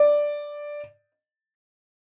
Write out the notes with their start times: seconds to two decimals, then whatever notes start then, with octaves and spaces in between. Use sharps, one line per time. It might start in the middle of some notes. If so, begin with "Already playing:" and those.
Already playing: D5